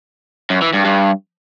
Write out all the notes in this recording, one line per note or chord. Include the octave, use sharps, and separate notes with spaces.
F#2
E3
G2
G2